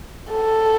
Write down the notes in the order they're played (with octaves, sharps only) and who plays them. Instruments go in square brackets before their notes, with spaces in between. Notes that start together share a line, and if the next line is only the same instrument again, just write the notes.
[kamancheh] A4